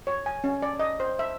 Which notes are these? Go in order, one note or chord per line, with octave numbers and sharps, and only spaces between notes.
C#5
G#5
C#4
D5
D#5
C5
E5